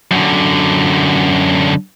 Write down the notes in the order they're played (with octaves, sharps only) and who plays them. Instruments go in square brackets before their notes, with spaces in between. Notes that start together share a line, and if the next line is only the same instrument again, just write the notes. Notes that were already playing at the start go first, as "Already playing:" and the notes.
[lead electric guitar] F#2 D3